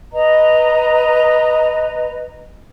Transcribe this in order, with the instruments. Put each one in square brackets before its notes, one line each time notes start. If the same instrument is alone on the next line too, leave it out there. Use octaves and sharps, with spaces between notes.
[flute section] B4 D#5 A#5